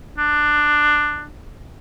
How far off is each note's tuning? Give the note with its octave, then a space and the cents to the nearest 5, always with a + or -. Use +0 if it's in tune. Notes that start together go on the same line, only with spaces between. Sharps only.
D4 +15